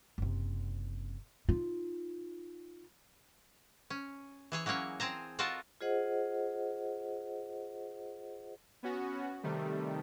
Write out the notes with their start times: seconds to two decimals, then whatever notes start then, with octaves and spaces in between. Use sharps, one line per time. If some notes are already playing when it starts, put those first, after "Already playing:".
0.18 F#1 C3
1.49 D#4 F4
3.90 C#4
4.52 E3 G#4 C#5
4.66 E3 F#3 A#3 C#4 C#5
5.00 C4 G#4 A5 A#5
5.39 F4 F#4 A4 A#4 D#5 A5
5.81 F4 G#4 C5 D#5 F#5
8.83 B3 C#4 F#4
9.43 C3 D#3 G3 A3